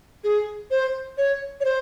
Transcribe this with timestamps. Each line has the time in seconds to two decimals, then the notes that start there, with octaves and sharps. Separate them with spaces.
0.24 G#4
0.71 C5
1.18 C#5
1.61 C#5
1.65 C5